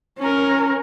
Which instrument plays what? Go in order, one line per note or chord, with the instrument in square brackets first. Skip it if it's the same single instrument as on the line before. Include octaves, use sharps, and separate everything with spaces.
[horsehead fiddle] C#4 A#4